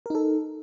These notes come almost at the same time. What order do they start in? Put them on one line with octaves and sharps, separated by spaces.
A#4 D#4 A4